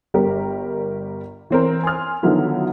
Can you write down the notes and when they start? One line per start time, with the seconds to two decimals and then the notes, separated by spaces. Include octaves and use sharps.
0.14 G1 G3 G4 A#4
1.50 E3 C4 A#4
1.83 G#5 C6 F6
2.23 D3 D#3 F3 F#3 B3 E4